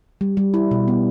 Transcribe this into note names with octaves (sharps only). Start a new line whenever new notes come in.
G3
G3
E4
B2
B3